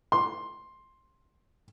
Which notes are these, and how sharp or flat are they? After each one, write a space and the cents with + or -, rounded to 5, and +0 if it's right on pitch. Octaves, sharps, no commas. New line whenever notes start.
C6 +10